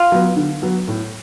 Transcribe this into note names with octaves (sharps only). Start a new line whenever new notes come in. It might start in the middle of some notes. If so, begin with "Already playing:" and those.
Already playing: F4
F#3 B3
D3
F#3 B3
A2